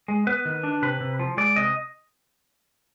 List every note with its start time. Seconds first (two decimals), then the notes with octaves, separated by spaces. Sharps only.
0.08 G#3
0.27 B3 B4
0.45 D#3
0.63 D4
0.82 C3 B4
1.00 C3
1.19 F3
1.37 G#3 D5
1.56 C3 D#5